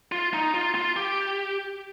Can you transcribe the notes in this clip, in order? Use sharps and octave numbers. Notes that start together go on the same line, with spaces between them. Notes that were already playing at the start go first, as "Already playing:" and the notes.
F4
D#4
F4
F4
G4